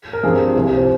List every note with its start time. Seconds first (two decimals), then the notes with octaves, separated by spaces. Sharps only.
0.13 A#4
0.24 G2 F3 C4 G#4
0.56 C2 C3 F3
0.77 C5